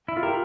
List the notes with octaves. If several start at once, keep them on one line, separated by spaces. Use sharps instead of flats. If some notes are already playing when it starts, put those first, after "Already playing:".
E4
F4
G4 A#4